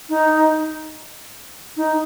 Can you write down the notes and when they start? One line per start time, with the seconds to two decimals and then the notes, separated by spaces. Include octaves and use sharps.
0.09 D#4
1.77 D#4